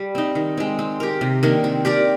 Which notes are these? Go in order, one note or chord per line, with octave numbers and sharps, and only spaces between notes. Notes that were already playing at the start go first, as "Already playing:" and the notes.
Already playing: G3
C4 D#4
D#3
G#3 C4
C4
G4 A#4
C3
D#3 A#3 D4
C4
G4 A#4 D5